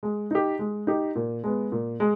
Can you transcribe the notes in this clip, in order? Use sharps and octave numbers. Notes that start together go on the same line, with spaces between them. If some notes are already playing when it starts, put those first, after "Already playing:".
G#3
D#4 G4
G#3
D#4 G4
A#2
G#3 B3
A#2
G#3